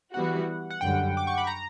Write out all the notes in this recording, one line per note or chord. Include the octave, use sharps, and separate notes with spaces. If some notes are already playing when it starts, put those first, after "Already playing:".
E3 G3 B3 F#4 F#5
F#5
F#2 D3 G3 G5
D6
C#6
B5
A#5